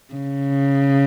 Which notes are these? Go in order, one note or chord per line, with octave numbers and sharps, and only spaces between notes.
C#3